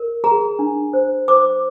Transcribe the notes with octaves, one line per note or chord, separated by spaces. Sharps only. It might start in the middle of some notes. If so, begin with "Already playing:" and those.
Already playing: A#4
G#4 A#5
D4
C5
C5 D6